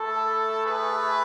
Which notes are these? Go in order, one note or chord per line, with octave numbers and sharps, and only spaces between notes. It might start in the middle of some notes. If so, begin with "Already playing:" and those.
Already playing: A3 E4 A4
G#4 B4